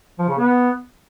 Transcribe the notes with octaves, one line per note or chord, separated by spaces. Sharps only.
F3
C#3
B3